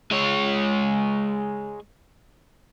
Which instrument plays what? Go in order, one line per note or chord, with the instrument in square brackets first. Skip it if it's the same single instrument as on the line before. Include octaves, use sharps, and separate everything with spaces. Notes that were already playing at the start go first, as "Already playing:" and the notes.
[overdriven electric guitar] G#3 C#5